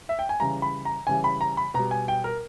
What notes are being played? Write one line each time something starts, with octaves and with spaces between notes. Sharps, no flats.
E5
G5
G#5
C#3 E3 G3 A#5
B5
A#5
C#3 E3 G3 G#5
B5
A#5
B5
B2 G3 A#5
G#5
G5
A#4